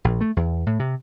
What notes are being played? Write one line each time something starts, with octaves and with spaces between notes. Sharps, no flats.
A#1
A3
E2
A2
C3